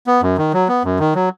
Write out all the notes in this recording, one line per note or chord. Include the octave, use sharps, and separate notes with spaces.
B3
F#2
D#3
F#3
B3
F#2
D#3
F#3